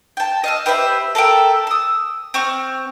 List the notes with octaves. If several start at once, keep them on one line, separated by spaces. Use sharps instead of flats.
G5 A5
D#5 F5 E6
G4 B4 C5 E5
A4 A#4 E5 G5
D#6 E6
C4 C#6 F6